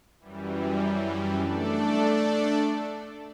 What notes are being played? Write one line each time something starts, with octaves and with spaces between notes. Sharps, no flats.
F#2 E3 G3
A3 D4 A4 D5